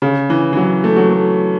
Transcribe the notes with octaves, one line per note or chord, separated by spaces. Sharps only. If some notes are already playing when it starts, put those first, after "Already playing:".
C#3
E3
E3
F#3
A3
F#3
A3